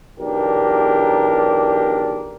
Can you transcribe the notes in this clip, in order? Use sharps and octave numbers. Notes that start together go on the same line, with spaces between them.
B1 E2 D4 G4 A#4